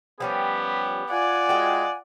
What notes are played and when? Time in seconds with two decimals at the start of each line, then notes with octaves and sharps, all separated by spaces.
0.20 F3 G3 B3 C#4 G4
1.10 F4 D5 F#5 G#5
1.49 G#3 F#4 G5